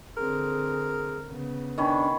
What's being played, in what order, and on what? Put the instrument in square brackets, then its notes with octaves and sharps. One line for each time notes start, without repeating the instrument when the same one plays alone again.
[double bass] D3 C4 [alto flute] G#4 [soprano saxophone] A#4
[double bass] C#3 B3
[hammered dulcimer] D#3 C#4 B5 [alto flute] D4